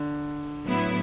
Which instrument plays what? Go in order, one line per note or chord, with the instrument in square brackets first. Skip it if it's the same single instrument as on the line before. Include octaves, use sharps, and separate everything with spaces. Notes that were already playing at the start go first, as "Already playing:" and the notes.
Already playing: [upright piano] D3
[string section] A2 F#3 B3 E4